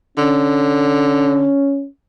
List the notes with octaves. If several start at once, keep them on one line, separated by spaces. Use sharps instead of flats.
D3 C#4